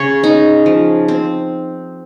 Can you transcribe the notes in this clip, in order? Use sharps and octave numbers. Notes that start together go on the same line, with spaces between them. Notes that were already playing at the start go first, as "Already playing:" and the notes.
Already playing: C#3 C#5
D#4
F3
C4